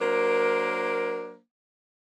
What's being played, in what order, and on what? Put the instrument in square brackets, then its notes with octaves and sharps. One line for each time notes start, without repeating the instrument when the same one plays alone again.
[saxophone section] F#3 A#3 D4 A#4 C5